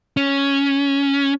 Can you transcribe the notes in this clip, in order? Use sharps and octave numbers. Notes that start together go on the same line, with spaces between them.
C#4